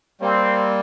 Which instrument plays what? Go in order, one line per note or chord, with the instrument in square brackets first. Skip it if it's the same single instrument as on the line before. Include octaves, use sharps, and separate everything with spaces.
[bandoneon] G3 A#3 [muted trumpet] C4